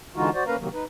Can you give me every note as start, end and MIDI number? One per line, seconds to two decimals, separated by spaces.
0.16 0.30 50
0.16 0.30 52
0.16 0.30 56
0.16 0.30 63
0.16 0.30 65
0.16 0.30 66
0.34 0.44 66
0.34 0.44 72
0.34 0.44 74
0.47 0.56 58
0.47 0.56 61
0.47 0.56 70
0.47 0.56 71
0.47 0.56 77
0.47 0.56 82
0.59 0.69 48
0.59 0.69 51
0.59 0.69 54
0.59 0.69 58
0.73 0.84 63
0.73 0.84 71